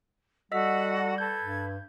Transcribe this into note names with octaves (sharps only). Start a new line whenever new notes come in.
G3 F#4 A4 D#5 F#5 E6 B6
A4 B4 G6 G#6
G2